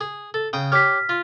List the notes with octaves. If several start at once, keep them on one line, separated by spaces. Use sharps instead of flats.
G#4
A4
C#3 G5 D#6
G4 C#5 F6 B6
F4